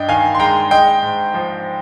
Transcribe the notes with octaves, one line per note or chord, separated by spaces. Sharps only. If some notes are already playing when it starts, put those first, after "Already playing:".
Already playing: G2 D#5 G5
D#3 F5 G#5
C6
G#3 G5 A#5
G#3 D#5 G5
G#2
F3